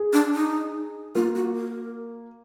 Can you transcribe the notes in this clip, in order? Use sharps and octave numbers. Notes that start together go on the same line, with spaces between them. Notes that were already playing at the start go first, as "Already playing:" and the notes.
Already playing: G#4
D4
D#4
A#3 F4
F#4
A#4